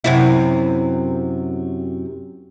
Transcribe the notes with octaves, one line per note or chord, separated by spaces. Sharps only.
F#2 C3 E4